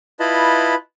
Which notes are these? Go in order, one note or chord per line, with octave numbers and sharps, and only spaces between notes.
E4 F4 B4 D#5 A5 B5